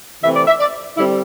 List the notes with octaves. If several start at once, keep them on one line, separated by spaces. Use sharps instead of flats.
C3 E3 A3 C4 E5
D5
E5
D5
D3 G3 C4 E4